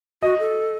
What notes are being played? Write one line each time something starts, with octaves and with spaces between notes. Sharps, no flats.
F#4 D#5
A4